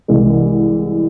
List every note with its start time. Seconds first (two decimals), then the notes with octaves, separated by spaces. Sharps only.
0.08 C2 C3 E3 G#3